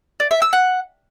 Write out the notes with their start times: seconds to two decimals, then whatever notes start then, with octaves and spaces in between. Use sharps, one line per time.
0.20 D5
0.31 E5
0.42 E6
0.53 F#5